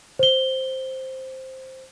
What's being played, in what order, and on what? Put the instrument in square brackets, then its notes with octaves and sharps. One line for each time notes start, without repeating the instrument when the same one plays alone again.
[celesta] C5 G7